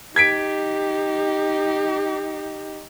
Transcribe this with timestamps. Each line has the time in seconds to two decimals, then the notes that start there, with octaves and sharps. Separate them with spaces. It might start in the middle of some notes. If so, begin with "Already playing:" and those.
0.16 D#4 G4 G#6 B6 D7